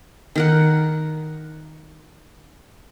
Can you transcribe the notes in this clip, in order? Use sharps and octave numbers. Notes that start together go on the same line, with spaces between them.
D#3 A#4 F#5